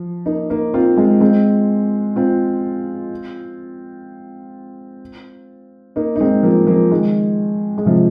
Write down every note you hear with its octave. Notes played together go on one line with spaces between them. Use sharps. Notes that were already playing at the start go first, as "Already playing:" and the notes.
Already playing: F3
A#3 D#4
A#3 D#4
C4 F4
G#3 C4
G#3 C4
C4 F4
A#3 D#4
D#4
G#3 C4
F3 A#3
F3 A#3
D#3 G#3
G#3
C3 F3